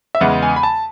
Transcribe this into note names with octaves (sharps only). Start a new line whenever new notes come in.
E5
E2 C#3 G#3 B3 F#5
G#5
B5
A5